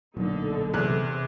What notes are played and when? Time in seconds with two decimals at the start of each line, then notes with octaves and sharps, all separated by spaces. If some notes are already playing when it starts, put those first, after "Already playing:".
0.17 D1 B1 A#2 D3 D#4 A4
0.74 E2 C3 F#6